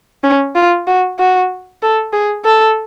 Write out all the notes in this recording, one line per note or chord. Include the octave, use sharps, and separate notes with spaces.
C#4
F4
F#4
F#4
A4
G#4
A4